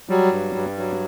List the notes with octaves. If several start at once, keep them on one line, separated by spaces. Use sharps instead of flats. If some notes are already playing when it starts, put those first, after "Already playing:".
F#3 G3
G2
G2
F#3